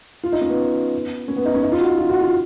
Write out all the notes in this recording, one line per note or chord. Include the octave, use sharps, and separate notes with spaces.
F4
D#4
C#4
B3
C#4
B3
D#4
C#4
D#4
F4
F#4
F4
F#4
F4